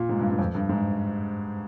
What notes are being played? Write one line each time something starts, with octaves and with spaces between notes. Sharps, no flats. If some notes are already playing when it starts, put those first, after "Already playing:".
Already playing: A#2
G#2
G2
G2
F2
G2
G#2